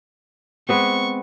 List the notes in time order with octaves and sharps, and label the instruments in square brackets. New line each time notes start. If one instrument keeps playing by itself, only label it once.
[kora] G#3 B3 C4 [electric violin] C#6